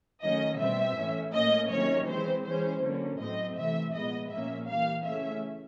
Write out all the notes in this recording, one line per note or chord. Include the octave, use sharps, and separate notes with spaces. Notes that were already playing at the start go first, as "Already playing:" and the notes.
D#3 F#3 A3 C#4 D#5
B2 G3 C4 E5
A2 E3 A3 C#4
A2 F3 A#3 C#4 D#5
C3 D#3 F#3 A#3 C#4 C#5
E3 G#3 C4 C5
E3 G#3 C#4 C5
D3 F#3 A#3 C#4
A2 F#3 A3 C4 D#5
C3 E3 A3 E5
A#2 F3 G#3 B3 D#5
A#2 F3 A#3 C#4 E5
E3 G3 A#3 F5
C#3 E3 A3 C#4 E5